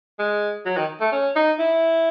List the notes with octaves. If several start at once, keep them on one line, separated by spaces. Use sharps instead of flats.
G#3
F#3
D#3
A3
C#4
D#4
E4